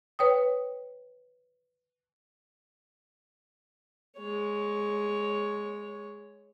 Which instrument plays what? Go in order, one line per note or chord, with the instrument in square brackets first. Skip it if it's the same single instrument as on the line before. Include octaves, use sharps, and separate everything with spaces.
[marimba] B4 C#5 G5 D#6
[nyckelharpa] G#3 C#5